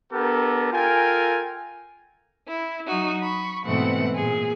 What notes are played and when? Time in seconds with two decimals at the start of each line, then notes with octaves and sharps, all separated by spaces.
0.12 B3 D4 G4 A4 A#4
0.72 F4 A4 A#4 G5 G#5
2.48 E4
2.87 F#3 D#4 F#4
3.21 B5 C#6
3.65 G#2 B2 E3 A3 C4 F#5
4.15 A#2 G#4